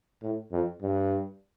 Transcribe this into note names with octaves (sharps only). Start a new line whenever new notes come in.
A2
F2
G2